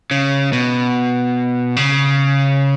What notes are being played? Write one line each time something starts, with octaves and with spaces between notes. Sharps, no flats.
C#3
B2
C#3